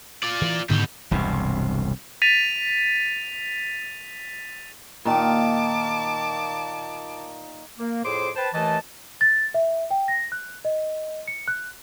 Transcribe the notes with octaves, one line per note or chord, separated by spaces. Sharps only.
F4 D5
E3
G#2 B2 D3 D#3 G4
E1 C2 G2 C3
A6 B6 D#7 F7
A#2 D#3 A5 D6
A#3
F2 A2 G#4 C5 C6 D6
B4 C5 G5 A5
D#2 E3 A3 D#5 A5
A6
E5
G5
A#6
F#6
D#5
C#7
F#6